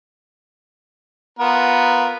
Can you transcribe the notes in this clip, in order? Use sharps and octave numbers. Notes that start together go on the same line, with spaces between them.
B3 F4 A#4